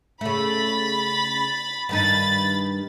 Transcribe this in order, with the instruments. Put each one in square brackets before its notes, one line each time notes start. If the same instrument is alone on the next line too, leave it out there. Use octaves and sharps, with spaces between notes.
[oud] C#3 A3 [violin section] B5 A6
[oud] G2 D#3 D#4 [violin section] B5 A6